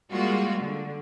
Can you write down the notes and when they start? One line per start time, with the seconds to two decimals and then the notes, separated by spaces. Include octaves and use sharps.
0.12 G3 G#3 A#3 F4 F#4
0.60 D3